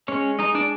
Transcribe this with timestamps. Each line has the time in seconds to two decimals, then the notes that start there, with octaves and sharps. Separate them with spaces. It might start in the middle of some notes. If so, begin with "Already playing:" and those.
0.08 G#3 C#4 C#5
0.39 G#3 D#4 D#5
0.55 D4 D5